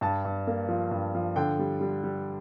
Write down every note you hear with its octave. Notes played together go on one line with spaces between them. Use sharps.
G2 A5
G2
A#3
F3
G2
F3
D3 G5
G3
G3
G3